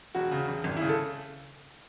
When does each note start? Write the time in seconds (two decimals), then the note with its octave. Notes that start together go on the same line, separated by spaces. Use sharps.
0.15 E1 F#4
0.31 C#3
0.48 E1
0.64 G#1
0.77 E4
0.81 C#3
0.89 A4